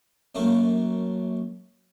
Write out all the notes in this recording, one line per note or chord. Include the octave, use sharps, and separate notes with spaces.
F#2 A3 A#3